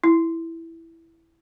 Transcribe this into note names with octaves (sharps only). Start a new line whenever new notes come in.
E4